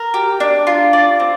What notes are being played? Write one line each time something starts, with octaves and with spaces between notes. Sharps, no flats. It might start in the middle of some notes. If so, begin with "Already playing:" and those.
Already playing: A#4
G4
D4
F4
D5
C4